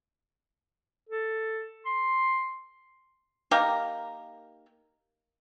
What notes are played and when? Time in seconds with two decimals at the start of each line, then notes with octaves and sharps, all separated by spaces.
1.09 A4
1.85 C6
3.51 A#3 D#4 G4 A#4